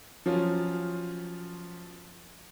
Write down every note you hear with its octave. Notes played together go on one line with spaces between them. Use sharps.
F3 F#3 C#4 F4